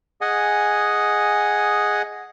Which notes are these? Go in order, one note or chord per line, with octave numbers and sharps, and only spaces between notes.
G#4 D#5 F#5 G#5